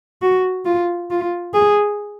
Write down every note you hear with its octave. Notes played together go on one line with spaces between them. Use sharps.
F#4
F4
F4
G#4